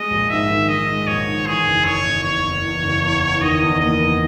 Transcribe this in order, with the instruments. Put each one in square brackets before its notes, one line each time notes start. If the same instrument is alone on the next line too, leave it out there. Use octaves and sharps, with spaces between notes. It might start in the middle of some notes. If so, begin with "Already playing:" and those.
Already playing: [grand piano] G#3 [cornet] D#5
[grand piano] A#1
[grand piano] G#2 [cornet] E5
[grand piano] D#3
[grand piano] D#3 [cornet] D#5
[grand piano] G#3
[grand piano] A#1 [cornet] C#5
[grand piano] D#3
[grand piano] E3 [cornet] G#4
[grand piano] F#1
[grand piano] F#1 [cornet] C#5
[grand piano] F#1
[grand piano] E2 [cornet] C#5
[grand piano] F#1
E2
F#1
E2
E2
[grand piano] D#3 [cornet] D#5
[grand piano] E2
[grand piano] A#3 [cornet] D#5
[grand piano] E2